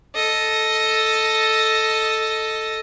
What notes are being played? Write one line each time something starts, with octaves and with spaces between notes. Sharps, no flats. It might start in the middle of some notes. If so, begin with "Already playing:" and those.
A4 D#5